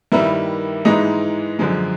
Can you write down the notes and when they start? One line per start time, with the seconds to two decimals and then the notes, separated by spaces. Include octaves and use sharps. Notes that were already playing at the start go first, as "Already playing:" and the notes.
0.12 G2 D#3 G3 A#3 E4
0.85 G#2 E3 G#3 D#4
1.59 F#2 D3 F3 G#3